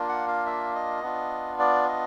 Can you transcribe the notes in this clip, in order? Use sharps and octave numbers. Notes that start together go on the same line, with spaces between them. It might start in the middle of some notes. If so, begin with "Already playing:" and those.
Already playing: A#3 D4 F4
F#5
F5
E5
D#5
B3 D4 F4
D5
D#5